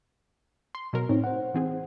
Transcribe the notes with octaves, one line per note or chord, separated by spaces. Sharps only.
C6
B2 F#3 A#4
A2 C4 D#4 C#5
C5 F#5
E3 C4 G#4